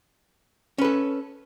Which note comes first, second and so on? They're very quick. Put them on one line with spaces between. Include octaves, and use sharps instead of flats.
C#4 B4 A4